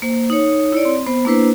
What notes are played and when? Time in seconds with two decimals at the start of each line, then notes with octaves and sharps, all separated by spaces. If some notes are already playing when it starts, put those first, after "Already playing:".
0.02 A#3 C5
0.30 D#4 C#5
0.72 E4 C#5 D5
0.85 C4
1.06 B3 C5
1.25 A#3 D4 E4 B4 C5